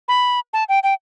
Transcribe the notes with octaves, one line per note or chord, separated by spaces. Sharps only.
B5
A5
G5
G5